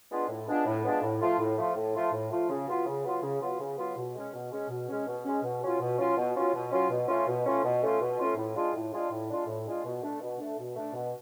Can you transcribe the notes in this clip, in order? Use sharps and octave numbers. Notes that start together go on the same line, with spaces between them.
G#3 B3 D4 F4
A2
G#3 B3 D4 F4
A2
G#3 B3 D4 F4
A2
F3 A3 F4
A2
F3 A3 F4
A2
F3 A3 F4
A2
F3 A3 F4
C#3
F#3 B3 F4
C#3
F#3 B3 F4
C#3
F#3 B3 F4
C#3
F#3 B3 F4
B2
G#3 C#4
B2
G#3 C#4
B2
G#3 C#4
B2
G#3 C#4
B2
F#3 C#4 F4
B2
F#3 C#4 F4
B2
F#3 C#4 F4
B2
F#3 C#4 F4
B2
A3 C#4 F4
B2
A3 C#4 F4
B2
A3 C#4 F4
B2
A3 C#4 F4
A2
G#3 D4 F4
A2
G#3 D4 F4
A2
G#3 D4 F4
A2
G#3 D4 F4
B2
A3 D4
B2
A3 D4
B2
A3 D4
B2